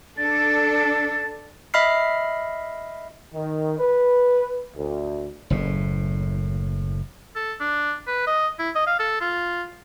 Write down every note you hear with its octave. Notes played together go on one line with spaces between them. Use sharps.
D4 A4 A6
D#5 E5 B5 F6 C7
D#3
B4
D2
F#1 A2
A4
D4
B4
D#5
E4
D#5
F5
A4
F4